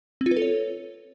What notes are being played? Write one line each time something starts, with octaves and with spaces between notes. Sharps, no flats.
C4
F4
B4
A4
C#5